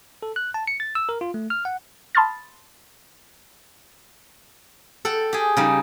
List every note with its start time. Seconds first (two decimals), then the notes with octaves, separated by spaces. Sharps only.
0.23 A4
0.36 F#6
0.54 A5
0.67 C#7
0.80 A6
0.95 E6
1.09 A#4
1.21 F4
1.34 A3
1.50 F6
1.65 F#5
2.15 A5 B5 C6 D#6 F6 A6
5.05 A4 F#5 G5
5.33 G4 G#4
5.57 C#3 G3 D#4